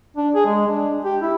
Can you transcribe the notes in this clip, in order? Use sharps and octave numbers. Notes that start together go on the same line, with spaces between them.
D4
G#4
G#3
D4
G4
E4